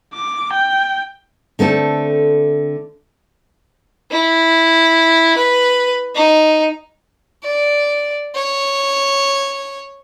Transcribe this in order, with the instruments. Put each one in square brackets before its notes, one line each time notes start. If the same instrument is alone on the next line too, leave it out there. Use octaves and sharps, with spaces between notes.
[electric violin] D6
G5
[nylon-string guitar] D3 A3 C4 A4
[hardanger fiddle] E4
B4
D#4
D5
C#5